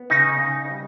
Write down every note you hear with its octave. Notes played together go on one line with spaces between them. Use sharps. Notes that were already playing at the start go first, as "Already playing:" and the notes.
Already playing: B3
C#3 D#4
C#3
G3